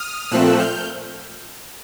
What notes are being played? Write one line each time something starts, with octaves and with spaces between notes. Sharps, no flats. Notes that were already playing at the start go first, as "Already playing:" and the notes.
Already playing: D#6 F6
A#2 F3 A3 C4 E6 F#6
F6 G6